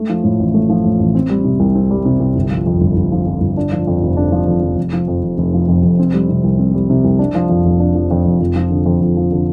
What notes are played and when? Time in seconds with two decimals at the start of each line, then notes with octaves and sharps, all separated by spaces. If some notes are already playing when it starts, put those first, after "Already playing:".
Already playing: A3
0.09 F3
0.24 A2
0.39 A1
0.54 A3
0.70 F3
0.84 A2
0.99 A1
1.15 C4
1.30 G3
1.44 C3
1.60 C2
1.75 C4
1.91 G3
2.05 C3
2.20 C2
2.36 G1
2.51 F3
2.66 F2
2.81 G1
2.97 G1
3.12 F3
3.27 F2
3.41 G1
3.57 D4
3.72 F3
3.87 F2
4.03 F1
4.17 D4
4.32 F3
4.47 F2
4.63 F1
4.77 F1
4.93 F3
5.08 F2
5.23 F1
5.38 F1
5.54 F3
5.68 F2
5.83 F1
5.99 C4
6.13 G3
6.29 C3
6.44 C2
6.59 C4
6.74 G3
6.90 C3
7.04 C2
7.19 D4
7.35 F3
7.50 F2
7.65 F1
7.80 D4
7.95 F3
8.11 F2
8.26 F1
8.40 F2
8.56 F3
8.70 D3
8.86 F2
9.01 F2
9.17 F3
9.32 D3